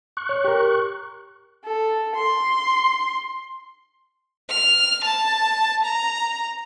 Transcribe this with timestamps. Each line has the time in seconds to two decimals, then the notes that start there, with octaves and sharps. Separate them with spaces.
0.17 C#6 F#6
0.29 C#5
0.44 G4 A#4
1.65 A4
2.16 C6
4.50 F6
5.04 A5
5.85 A#5